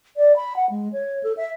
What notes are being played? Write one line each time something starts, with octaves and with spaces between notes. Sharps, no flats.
D5
B5
F#5
G#3
C#5
A4
E5